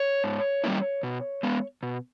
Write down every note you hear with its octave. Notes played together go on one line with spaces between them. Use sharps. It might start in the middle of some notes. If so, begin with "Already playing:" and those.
Already playing: C#5
G#2
G3 A#3 C#4 E4
B2
G#3 B3
B2